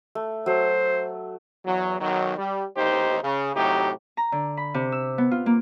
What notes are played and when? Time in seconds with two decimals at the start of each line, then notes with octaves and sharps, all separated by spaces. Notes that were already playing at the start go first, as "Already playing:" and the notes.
0.15 A3
0.46 F#3 A3 C5
1.65 E2 F#3
2.00 B1 D#3 F#3
2.38 G3
2.76 A1 D#2 D#4 G4 C5
3.23 C#3
3.55 A2 C3 F#3 D#4 G4
4.17 A#5
4.32 D3
4.57 B5
4.74 C3
4.92 E6
5.18 B3
5.31 F4
5.46 A#3